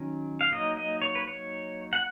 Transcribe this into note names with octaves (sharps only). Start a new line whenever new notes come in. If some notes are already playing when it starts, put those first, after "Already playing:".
Already playing: D#3 F#3 C#4
F5
F#3 A#3 D#4 D#5
D#5
C#5
B4
C#5
F#5